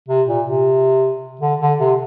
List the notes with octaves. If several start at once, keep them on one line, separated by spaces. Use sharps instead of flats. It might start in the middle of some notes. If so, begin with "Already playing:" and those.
C3
A#2
C3
D3
D3
C3